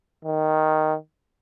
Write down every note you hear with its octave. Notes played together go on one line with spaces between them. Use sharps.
D#3